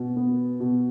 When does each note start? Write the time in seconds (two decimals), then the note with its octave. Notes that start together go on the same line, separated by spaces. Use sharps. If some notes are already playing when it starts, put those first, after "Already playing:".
Already playing: B2
0.16 B3
0.60 B2